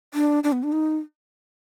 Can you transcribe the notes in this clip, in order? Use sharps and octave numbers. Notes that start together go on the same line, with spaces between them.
D4
D4
B3
D4
D#4